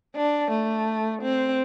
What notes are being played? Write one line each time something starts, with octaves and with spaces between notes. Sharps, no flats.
D4
A3
C4